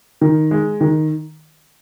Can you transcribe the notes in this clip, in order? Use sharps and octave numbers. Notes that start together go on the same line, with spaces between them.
D#3
G#3
D#3